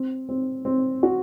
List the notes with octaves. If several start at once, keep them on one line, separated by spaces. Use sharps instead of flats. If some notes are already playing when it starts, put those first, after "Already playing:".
Already playing: C4
C4
C4
F#4